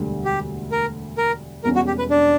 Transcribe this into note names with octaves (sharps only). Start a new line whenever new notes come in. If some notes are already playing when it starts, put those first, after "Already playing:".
Already playing: E1 D2 D3 G3
G4
A#4
A#4
E1 E2 B2 G3 C#4 A#4
F#4
G4
B4
D4